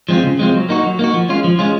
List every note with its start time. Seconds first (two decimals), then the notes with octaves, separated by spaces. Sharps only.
0.09 F3 G#3 C4 F4
0.23 C#3
0.39 F3 G#3 C4 F4
0.54 F#3
0.69 A#3 D#4 F#4
0.83 F#3
0.99 A#3 D#4 F#4
1.14 F3
1.29 G#3 C#4 F4
1.44 F3
1.59 G#3 C#4 F4